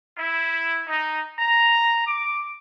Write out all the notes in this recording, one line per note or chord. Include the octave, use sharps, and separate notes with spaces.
E4
D#4
A#5
D6